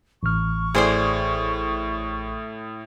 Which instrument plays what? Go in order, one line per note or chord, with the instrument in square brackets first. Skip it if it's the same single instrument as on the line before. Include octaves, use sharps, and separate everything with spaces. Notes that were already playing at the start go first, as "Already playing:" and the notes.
[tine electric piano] A1 F6 [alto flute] C#6
[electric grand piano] A2 [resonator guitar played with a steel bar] G#4 C5 D5